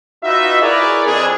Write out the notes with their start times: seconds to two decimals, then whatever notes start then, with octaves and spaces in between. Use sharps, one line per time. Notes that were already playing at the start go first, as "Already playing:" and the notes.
0.23 D#4 F4 F#4 B4 D#5 E5
0.61 E4 G#4 A#4 B4 C#5 D5
1.06 F2 C4 D4 G#4